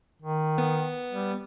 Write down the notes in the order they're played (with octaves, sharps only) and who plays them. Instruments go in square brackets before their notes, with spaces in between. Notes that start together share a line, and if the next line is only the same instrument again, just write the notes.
[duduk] D#3
[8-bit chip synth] B3
[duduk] G3